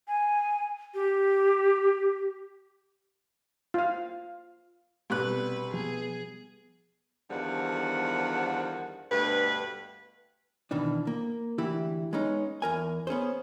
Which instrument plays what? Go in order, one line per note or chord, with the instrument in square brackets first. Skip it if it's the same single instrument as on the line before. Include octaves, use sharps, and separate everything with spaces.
[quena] G#5
G4
[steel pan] F4 F5
[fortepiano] C2 F#6 [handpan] B2 G3 B3 [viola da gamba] B4
[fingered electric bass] F3 [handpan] B3 [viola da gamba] G#4
[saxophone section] E2 D3 D#3 F3 G3 F#5
D2 G2 B2 B4
[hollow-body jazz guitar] B2 D#3 E3 D4
A#3
D2 E3 E4 G4 F#5
G#3 B3 C#4 D#4
E2 A#4 G#5
B3 C#4 G#4 C5